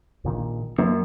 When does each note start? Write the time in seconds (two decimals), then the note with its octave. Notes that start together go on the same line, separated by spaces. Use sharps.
0.24 A#1 A#2 D#3
0.79 F#2 A#3